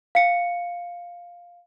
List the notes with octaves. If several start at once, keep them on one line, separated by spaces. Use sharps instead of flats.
F5 C#7